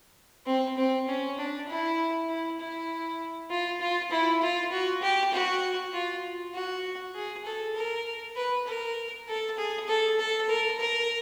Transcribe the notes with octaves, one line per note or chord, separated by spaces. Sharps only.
C4
C4
C#4
D4
E4
E4
E4
F4
F4
E4
F4
F#4
G4
F#4
F4
F#4
G#4
A4
A#4
B4
A#4
A4
G#4
A4
A4
A#4
A#4